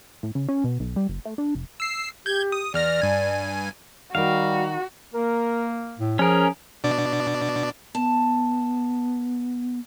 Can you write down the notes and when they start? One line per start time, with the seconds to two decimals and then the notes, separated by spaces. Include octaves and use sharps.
0.23 A2
0.35 C#3
0.49 C#4
0.64 B2
0.80 B1
0.96 G3
1.09 F#1
1.25 A3
1.38 D4
1.55 F1
1.80 E6 C7
2.26 G4 G6 G#6
2.52 D#6
2.74 E2 D5 F6 A#6
3.02 G2 G#5
4.15 D#3 G3 F#4 A#4 F5
5.14 A#3 A#4
5.99 A2
6.19 F3 C#4 G#4 A#4
6.84 B2 D4 D5
7.95 B3 A5